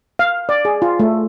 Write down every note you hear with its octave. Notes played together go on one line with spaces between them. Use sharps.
F5
D5
G#4
F4
A3